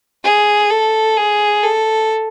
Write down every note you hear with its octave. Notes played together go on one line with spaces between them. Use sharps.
G#4
A4
G#4
A4